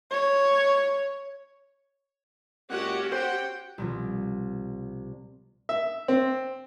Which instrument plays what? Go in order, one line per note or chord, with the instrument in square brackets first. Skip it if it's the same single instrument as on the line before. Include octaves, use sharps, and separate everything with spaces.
[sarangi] C#5
[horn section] A#2 G#3 F#5 [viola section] C#4 F#4 G4
[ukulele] C5 [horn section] F#5 G5
[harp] C2 B2 F3
[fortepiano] E5
C4